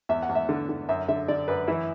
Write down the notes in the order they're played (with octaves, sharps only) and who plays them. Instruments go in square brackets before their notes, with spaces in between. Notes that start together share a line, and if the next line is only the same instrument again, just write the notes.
[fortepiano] E2 E5
F#5
E2
E5
D3
D3
F#2 E5
D3 E5
D3 D5
F#2 B4
E3 E4